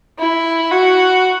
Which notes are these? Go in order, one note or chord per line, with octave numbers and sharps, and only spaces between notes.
E4
F#4